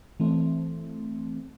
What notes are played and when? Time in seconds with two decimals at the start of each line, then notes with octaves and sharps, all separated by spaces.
0.20 E3 A3 C4